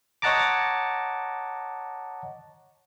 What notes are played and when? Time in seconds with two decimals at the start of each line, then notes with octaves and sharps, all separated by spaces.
0.22 C#5 D#5 F#5 A5 A#5 D6